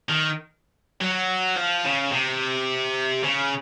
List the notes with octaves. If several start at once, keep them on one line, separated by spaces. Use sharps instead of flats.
D#3
F#3
F3
C#3
C3
C#3